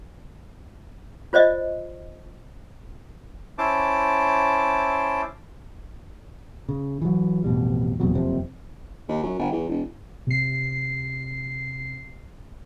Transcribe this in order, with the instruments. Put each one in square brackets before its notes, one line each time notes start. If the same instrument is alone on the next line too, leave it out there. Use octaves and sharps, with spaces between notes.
[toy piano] F4 C5 D5 D#5
[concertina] C#4 E4 C5 A5 D6
[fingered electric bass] C#3
E3 F#3
A1 F2 B2 G3
A#1 E2 C3 F#3
F#1 F2 C3
[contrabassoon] D#2
F#2
G1
E2
E1
[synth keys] C3 C7